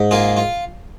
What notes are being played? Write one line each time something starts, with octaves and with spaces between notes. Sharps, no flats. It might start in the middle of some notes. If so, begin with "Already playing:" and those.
Already playing: G#2
A#3 F4 G#4
F4